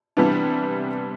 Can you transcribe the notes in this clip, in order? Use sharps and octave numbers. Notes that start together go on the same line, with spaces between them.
C3 E3 G3 B3 D4